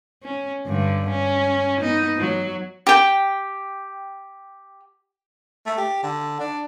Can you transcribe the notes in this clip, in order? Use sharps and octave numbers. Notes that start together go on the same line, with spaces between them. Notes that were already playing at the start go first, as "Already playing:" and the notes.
C#4
G2 D3
C#4
B3 D#4
F#3
G4 G5
A3
G4
D3
D4